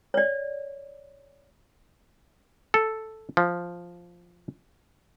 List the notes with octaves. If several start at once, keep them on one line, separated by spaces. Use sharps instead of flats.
C#5 D5
A4
F3